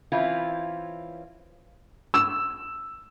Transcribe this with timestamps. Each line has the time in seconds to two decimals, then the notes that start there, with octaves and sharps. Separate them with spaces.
0.12 E3 C4 C#4 E4 F4
2.14 E6 E7